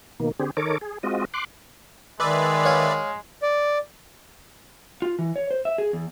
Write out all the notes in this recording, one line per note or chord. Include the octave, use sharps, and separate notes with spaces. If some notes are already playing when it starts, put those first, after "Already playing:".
B2 D#3 A#3
D3 C4 G4 G#4
D#3 A4 A#4 C#5 D6
G#4
G#3 C4 F4 F#4 D#5
C6 D6 F#6
D#3 G#3 B4 D5 E5
C#5 F5 G#5
D5
F4
E3
C#5
C5
E5
G#4
E2